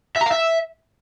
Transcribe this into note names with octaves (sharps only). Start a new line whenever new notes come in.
E5
A#5
F5
E5